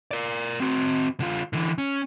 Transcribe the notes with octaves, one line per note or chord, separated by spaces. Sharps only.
A#4 D5
C4 F#4
D3 F4
D3 E3
C#4